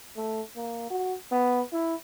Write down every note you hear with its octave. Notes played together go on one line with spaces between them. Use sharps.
A3
A#3
F#4
B3
E4